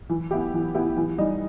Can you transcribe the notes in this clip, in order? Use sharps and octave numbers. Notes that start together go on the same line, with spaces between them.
E3
B3 E4 G4
E3
B3 E4 G4
E3
G3 D#4